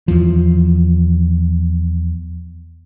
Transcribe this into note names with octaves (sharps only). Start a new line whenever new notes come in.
E2 F3